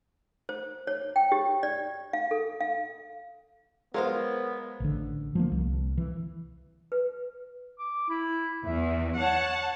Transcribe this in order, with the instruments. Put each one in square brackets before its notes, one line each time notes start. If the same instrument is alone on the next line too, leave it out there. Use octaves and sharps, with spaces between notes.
[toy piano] C5
C#5
G5
G4
D5
F5
A4
F5
[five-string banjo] F#3 F4 D#5 [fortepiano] G#3 [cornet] B3 [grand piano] A#4 C5
[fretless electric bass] A1 D3
F3 F#3 A#3
C2
E3
[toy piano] B4
[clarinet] D6
E4
[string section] E2 [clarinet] E5
[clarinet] C#5 [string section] F#5 A5